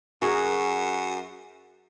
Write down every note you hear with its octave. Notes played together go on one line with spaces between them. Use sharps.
F#2 F#4 G#4 A#4